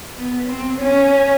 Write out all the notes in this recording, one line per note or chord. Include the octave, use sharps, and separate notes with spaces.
B3
C4
C#4